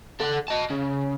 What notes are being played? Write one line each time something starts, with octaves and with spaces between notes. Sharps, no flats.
A4 F#5
D#5 A5
C#3